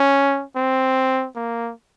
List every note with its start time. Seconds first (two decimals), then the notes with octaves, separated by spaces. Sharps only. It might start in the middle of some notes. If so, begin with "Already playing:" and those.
Already playing: C#4
0.56 C4
1.36 A#3